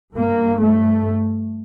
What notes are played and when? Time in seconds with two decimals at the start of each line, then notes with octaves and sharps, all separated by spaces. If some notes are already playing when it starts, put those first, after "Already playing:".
0.14 G2 A#3
0.60 A3